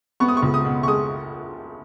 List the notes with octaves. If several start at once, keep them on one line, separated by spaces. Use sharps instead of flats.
B3 C#6
D#6
C#6
C#2
D#6
B2
C#6
G#3 D#6